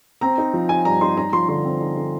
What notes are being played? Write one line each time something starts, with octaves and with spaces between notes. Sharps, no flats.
C4 A#5
D#4
F3
D#4 G#5
G2 A#5
D#4 C6
D#4 A#5
F3 C6
D3 C6
C4
D#4
D3